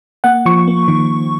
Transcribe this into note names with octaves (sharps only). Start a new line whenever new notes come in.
A#3 F#5
F3 C#6
A#3
D#3